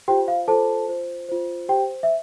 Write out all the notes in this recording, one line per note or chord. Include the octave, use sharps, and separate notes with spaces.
F4 G4 C5 G5
F5
F4 A4 C5 A5
F4 C5
F4 C5
G4 C5 G5
E5